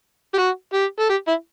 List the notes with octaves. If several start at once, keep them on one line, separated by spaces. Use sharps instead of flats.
G4
F#4
G4
A4
G4
E4